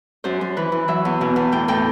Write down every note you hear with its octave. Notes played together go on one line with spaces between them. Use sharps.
F#2 C5
F#2
E3 B4
E3
F#3 E5
E2
B2
E2
A2 G5
A2 G5